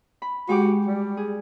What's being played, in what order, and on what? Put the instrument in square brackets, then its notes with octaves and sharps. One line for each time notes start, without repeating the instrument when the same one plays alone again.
[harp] B5
[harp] G#3 G4 D6 [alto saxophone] F#4
[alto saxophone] G3
[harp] G#4